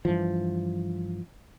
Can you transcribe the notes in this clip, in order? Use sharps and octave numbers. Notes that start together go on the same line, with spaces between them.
G2 E3 F3